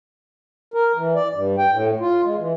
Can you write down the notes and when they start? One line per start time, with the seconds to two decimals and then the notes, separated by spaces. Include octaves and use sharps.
0.74 A#4
0.95 E3
1.15 D5
1.33 G2
1.58 G5
1.71 A2
2.00 F4
2.24 G#3
2.38 E3